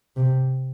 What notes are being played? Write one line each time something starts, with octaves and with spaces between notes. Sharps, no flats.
C3